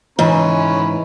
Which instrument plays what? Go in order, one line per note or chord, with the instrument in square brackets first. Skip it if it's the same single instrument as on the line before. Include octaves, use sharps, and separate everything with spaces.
[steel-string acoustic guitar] G#2 [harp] E3 [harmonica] C#4 B4 B5